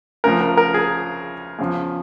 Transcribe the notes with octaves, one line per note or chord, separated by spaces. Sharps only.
D2 C#3 F3 A#4
A#4
A#4
G#4
E2 C#3 F3